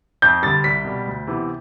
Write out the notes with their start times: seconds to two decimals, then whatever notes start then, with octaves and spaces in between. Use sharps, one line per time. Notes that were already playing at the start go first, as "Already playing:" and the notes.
0.22 F2 G6
0.43 D3 G3 A6
0.64 C2 B6
0.85 B2 G3
1.06 D2
1.27 C3 E3 B3